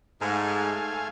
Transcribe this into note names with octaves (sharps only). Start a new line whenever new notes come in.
G#2 A3 F5 G#5